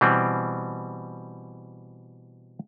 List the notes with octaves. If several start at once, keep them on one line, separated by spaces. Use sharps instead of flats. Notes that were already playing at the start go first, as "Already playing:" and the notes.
B2 E3 G3 C4